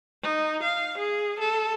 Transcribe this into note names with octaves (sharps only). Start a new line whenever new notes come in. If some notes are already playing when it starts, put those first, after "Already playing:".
D#4
F5
G#4
A4